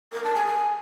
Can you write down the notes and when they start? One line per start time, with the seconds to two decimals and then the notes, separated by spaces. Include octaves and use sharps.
0.13 A#4
0.24 A5
0.35 G#5
0.46 G#5